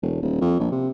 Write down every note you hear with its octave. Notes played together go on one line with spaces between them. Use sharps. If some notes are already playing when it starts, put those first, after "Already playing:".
E1
D#1
F2
A#1
C3